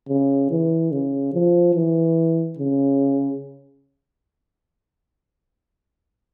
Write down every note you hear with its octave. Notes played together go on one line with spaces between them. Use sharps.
C#3
E3
C#3
F3
E3
C#3